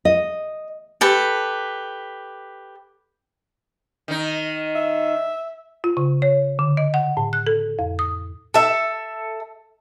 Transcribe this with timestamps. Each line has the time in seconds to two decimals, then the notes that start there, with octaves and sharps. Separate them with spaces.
0.05 D#5
1.01 G4 A4 B4
4.08 D#3 D#4
4.75 E5
5.84 F4
5.97 C#3
6.22 C#5
6.59 D3
6.77 D#5
6.94 F#5
7.17 A2
7.33 F#6
7.47 A4
7.79 F2
7.99 D#6
8.54 A4 E5